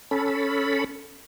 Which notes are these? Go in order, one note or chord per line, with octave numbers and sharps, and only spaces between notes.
C#4 A4 B5